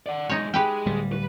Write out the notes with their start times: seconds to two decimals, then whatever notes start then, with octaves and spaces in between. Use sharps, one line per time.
0.06 D5 F#5
0.29 B1 G#3 D#4 C#5
0.54 G#3 G4 G#4 B4 G5
0.86 D1 G3
1.12 B4